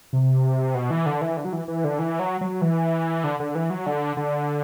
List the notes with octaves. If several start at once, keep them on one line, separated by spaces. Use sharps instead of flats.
C3
B2
E3
D3
E3
D3
F#3
E3
E3
D3
E3
F#3
F#3
E3
D3
D3
E3
F#3
D3
D3